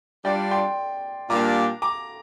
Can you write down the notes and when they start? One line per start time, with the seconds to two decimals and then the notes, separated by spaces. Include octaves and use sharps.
0.25 G3 D4 F4 D5 G5
0.51 G5 C6
1.30 A#2 G3 A#3 D4 G4 A#5 D6
1.82 A#5 D6